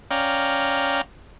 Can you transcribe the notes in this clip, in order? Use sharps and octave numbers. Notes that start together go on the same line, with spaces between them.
C#4 D5 F5 G5 A#5